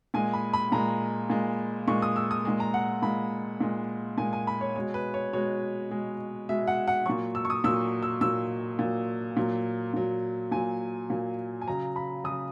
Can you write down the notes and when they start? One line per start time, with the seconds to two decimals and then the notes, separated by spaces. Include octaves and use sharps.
0.14 A#2 G#3 G#5
0.33 B5
0.53 B5
0.72 A#2 G#3 A#5
1.30 A#2 G#3
1.88 A#2 G#3 C#6
2.02 D#6
2.16 E6
2.31 D#6
2.45 A#2 G#3
2.60 A#5
2.74 F#5
3.02 A#2 G#3 B5
3.61 A#2 G#3
4.18 A#2 G#3 G#5
4.33 G#5
4.47 B5
4.61 C#5
4.76 B2 G#3 C#5
4.94 B4
5.14 C#5
5.33 B2 G#3 C#5
5.91 B2 G#3
6.49 B2 G#3 E5
6.68 F#5
6.88 F#5
7.06 A#2 F#3 C#6
7.35 E6
7.45 C#6
7.50 D#6
7.64 A#2 F#3 E6
8.03 E6
8.21 A#2 F#3 E6
8.79 A#2 F#3
9.37 A#2 F#3
9.94 A#2 F#3
10.51 A#2 F#3 G#5
11.10 A#2 F#3
11.61 G#5
11.67 C#3 F#3 A#5
11.96 B5
12.24 C#3 F#3 D#6